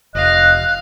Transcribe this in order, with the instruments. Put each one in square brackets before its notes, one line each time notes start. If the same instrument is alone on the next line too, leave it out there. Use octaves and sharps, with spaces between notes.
[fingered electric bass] F1 [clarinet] D#5 [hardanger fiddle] F5 [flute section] F#6